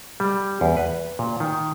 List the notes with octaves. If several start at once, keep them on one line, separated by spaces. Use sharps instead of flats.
G3
E2
B4
A#2
D#3